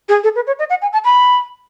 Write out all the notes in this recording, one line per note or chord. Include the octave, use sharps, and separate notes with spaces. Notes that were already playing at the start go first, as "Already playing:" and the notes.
G#4
A4
B4
C#5
D#5
F#5
G#5
A5
B5